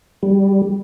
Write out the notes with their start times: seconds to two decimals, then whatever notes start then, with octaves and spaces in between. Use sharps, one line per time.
0.23 G3